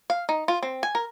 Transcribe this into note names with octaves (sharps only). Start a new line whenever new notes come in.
F5
D#4
F4
C4
G#5
A#4